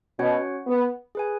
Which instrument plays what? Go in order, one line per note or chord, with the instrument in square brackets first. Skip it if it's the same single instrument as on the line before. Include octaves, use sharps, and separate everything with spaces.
[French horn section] B2 [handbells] C#4 F#4 C#5 F#5
[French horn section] B3
[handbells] G#4 B4 G#5